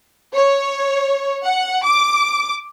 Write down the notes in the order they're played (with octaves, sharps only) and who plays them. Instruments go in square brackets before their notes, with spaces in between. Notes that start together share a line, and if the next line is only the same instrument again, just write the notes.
[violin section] C#5
F#5
D6